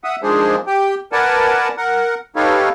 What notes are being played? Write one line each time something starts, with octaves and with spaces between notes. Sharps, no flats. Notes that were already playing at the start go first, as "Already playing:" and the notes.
E5 F#5 D#6
D#3 F3 G#3 D4 G#4 C5
G4 G5
A#4 B4 D5 F#5 G#5 A5
A#4 F#5
D#4 G4 A4 B4 C#5 F5